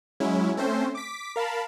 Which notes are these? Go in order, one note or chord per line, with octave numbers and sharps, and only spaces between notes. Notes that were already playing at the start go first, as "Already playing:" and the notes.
F#3 G#3 C#4 E4
A3 C4 C#4 C5
D6 B6
A#4 F5 A5 B5